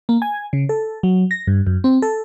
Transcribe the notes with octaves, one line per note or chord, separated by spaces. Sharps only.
A#3
G#5
C#3
A4
F#3
A#6
G2
F#2
C4
A4